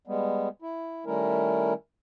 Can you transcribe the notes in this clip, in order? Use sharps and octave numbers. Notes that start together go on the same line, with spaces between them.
G3 G#3 B3
E4
D#3 G3 A3 C#4 E4 A#4